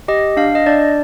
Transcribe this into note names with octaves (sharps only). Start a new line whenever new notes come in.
G4 D#5
D4 F5
D#5
D4 D5